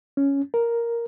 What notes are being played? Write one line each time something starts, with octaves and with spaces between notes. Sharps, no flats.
C#4
A#4